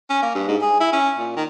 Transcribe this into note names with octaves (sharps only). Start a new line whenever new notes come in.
C#4
A#3
G2
G#2
G#4
E4
C#4
A#2
D#3